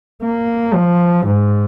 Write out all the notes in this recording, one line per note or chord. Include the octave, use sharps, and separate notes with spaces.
A#3
F3
G#2